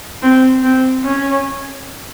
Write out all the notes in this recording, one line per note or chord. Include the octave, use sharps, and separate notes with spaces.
C4
C4
C#4